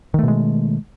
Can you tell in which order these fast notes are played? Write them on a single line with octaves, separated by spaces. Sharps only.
D#3 A3 B2 G#3